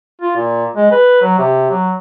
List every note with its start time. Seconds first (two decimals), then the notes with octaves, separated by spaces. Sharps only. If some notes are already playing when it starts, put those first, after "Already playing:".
0.21 F4
0.36 A#2
0.76 G#3
0.91 B4
1.22 F#3
1.38 C3
1.70 F#3